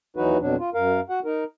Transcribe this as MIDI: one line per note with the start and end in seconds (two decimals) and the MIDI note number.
0.17 0.38 39
0.17 0.38 52
0.17 0.38 54
0.17 0.38 63
0.17 0.38 66
0.17 0.38 71
0.40 0.56 41
0.40 0.56 47
0.40 0.56 54
0.40 0.56 62
0.59 0.70 65
0.74 1.00 42
0.74 1.00 70
0.74 1.00 77
1.09 1.20 66
1.09 1.20 78
1.25 1.44 63
1.25 1.44 70